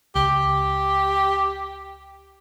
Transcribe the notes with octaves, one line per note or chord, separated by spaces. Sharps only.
C#2 G4